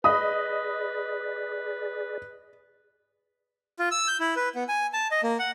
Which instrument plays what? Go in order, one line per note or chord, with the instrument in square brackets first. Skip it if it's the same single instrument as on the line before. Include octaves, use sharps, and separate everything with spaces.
[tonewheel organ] G#4 D5 [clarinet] B4 [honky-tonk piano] D#5 B5 [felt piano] D#6
[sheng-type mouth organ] F4
E6
G6
E4
B4
B3
G#5
A5
D#5
A#3
F#5